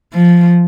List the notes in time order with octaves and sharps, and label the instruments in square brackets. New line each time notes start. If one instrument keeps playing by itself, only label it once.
[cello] F3